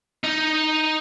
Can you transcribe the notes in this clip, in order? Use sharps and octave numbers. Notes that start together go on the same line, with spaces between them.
D#4